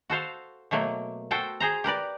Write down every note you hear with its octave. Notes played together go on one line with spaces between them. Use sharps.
F#4 A4 C5 F5
B2 F#3 A3 A#3
F#4 A4 C5 G5 A5
G#4 C5 A#5
G4 A#4 B4 D5